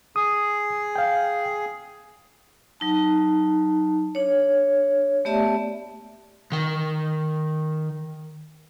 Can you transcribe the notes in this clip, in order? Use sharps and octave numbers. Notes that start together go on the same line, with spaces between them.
G#4 D#6
F5 G5
F#3 D#4 A5
D4 C#5
A3 B3 G4 D5 E5 A5
D#3 G5